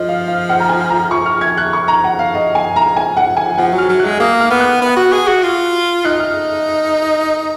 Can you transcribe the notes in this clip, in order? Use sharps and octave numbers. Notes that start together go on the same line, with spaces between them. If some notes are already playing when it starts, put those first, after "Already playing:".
Already playing: F3 D#5
F5
F5
F#5
A#5
G#5
A#5
F3 C#6
F6
G#6
F#6
C#6
A#5
F#5
F5
D#5
G#5
A#5
G#5
F#5
G#5
F3 F#5
F#3
F6
F#3
F#6
G#3
A#3 D#6
F6
B3
F#6
B3
F#4
G#4
F#4
F4
D#4 F#6
F6